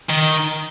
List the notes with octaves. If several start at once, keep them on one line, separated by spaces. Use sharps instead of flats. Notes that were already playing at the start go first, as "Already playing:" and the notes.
D#3